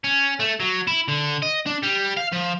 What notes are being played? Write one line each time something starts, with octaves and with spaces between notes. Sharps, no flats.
C#4
A3
F#3
E4
D3
D#5
D4
G3
F5
F3